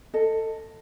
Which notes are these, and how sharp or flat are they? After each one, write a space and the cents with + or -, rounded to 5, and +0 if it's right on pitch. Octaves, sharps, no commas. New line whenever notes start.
A4 +15 D#5 +0